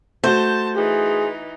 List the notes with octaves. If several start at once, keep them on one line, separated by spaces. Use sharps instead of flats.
A3 F#4 C5 A5
E3 D#4 G#4